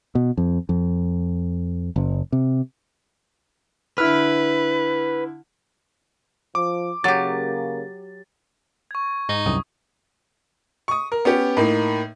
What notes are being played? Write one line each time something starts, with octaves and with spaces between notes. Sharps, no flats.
B2
F2
F2
F#1
C3
D3 E4 B4 F6
F3 D6
C#3 F#3 A#3 G4 A6
C#6 G#6
G#2 D#4
C2 F#2 D#6
C#6 D#6
A#4
B3 C#4 G4
A2 A#3 D#4